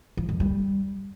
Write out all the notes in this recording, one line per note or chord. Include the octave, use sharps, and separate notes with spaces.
F3
F2
G3